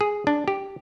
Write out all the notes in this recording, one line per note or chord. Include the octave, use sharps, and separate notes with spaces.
G#4
D4
G4